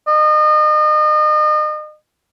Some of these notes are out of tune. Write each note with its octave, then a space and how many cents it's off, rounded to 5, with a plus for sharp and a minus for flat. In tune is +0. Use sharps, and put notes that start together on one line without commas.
D#5 -35